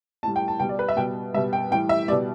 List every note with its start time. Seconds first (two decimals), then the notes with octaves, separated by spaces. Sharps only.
0.23 A2 G3 A5
0.36 G5
0.48 A5
0.60 B2 G3 G5
0.69 D5
0.79 B4
0.89 E5
0.97 B2 G3 G5
1.34 B2 G3 E5
1.53 G5
1.71 A2 E3 G3 G5
1.89 E5
2.08 G3 D5
2.12 B2